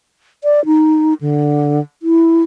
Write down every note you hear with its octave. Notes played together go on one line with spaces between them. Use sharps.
D5
D#4
D3
E4